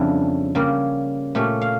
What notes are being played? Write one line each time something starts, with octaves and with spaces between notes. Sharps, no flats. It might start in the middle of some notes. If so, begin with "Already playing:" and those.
Already playing: F2 C#3 G3 D4 E4
C#3 G3 A#3
A#2 A3 C#4 G4
F5